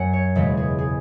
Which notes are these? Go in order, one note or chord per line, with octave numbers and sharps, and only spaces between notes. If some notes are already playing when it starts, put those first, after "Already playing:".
Already playing: F#2 F#3 C#4 F#5 G#5
C#5
E1 E2 C#3 G#3 C#4 B4
G#4
G#4